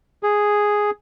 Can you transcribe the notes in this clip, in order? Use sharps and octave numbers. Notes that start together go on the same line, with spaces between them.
G#4